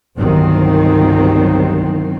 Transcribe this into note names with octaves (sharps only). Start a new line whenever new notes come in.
G1 C2 D#3 F#3 C4